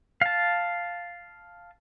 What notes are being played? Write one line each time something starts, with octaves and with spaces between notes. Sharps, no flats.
F5 A5